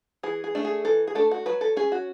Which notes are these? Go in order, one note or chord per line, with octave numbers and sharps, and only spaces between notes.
E3 G#4
G#4
A3 D4
G#4
E3 A4
G#4
A3 D4 A4
F#4
F#3 B4
A4
C#4 G#4
F#4